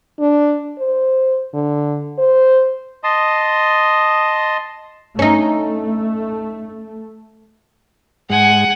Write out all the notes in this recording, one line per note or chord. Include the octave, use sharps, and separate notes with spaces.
D4
C5
D3
C5
D#5 A5 C6 D#6
A3 C#4 D#4
G#2 G#3 F#5 G#5